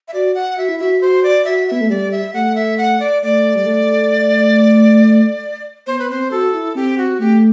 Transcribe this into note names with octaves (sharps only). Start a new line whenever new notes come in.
E5
F#4 D5
F#5
F#4 E5
E4
F#4 E5
F#4 C5
D5
F#4 E5
B3 E5
A3
G3 D5
E5
A3 F#5
E5
F#5
D5
A3 D5
G3
A3
B3 C5
B4
C4 C5
F#4 A4
E4
C4 G4
F#4
A3 G4